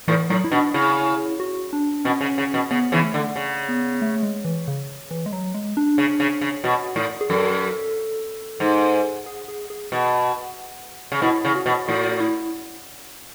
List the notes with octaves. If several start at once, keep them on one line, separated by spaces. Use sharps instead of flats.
A2 E3
A2 F#3
E4
B2 D4
C#3 E4
F#4
D4
B2 C#4
C#3
C#3
B2
C#3 B3
C#3 E3
A3
D3
C#3
B3
A3
G#3
E3
C#3
E3
G#3
F#3
G#3
D4
C#3
C#3
C#3
B2 F#4
A2
G#4
F#2 A4
G#2
G#4
G#4
G#4
B2
C#3
B2 E4
C#3
F#4
B2
A2 F#4
F#4
E4